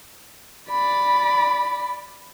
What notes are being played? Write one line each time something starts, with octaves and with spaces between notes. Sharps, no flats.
D5 B5